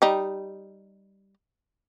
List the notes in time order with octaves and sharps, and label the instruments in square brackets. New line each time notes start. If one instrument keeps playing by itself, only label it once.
[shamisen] G3 D#4